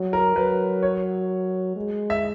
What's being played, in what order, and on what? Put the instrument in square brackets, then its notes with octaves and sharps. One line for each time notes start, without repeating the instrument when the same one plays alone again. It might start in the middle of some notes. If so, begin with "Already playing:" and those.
Already playing: [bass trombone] F#3
[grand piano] A#4
[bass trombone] F#3 [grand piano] B4
[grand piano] C#5
[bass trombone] G#3
[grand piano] E5